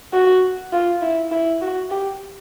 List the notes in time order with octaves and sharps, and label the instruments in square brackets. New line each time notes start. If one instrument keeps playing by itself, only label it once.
[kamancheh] F#4
F4
E4
E4
F#4
G4